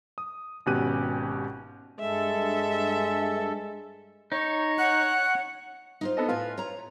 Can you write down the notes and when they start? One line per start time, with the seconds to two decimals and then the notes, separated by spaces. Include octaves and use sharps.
0.18 D#6
0.66 G#1 B2 C#4 G4 F#6 D#7
1.99 G2 G#3 A4 E5
4.32 D#4 C#5
4.78 F#5 F#6
6.01 D#4 F4 C5
6.17 B3 A4 D#5
6.29 A2 F4 B4 G#5
6.58 C#5 A#5